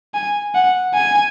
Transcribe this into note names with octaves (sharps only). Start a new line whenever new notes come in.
G#5
F#5
G#5